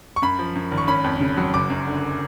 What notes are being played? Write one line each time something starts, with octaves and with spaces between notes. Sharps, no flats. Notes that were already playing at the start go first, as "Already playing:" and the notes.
C#6
F#2 B5
F3
F#2
G#1
C#6
C#4 B5
F2
C#3
F#3
F#1 D6
F#2
D3